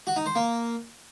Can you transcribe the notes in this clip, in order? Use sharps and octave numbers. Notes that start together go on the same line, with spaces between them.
F#4
D#4
C5
A#3